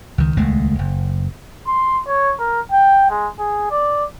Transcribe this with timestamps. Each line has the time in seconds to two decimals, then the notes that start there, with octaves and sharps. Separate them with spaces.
0.18 C#2 D#3
0.36 D#1 C#2 G#3 A3
0.79 F#1
1.67 C6
2.07 C#5
2.39 A#4
2.72 G5
3.10 G#3
3.39 G#4
3.71 D5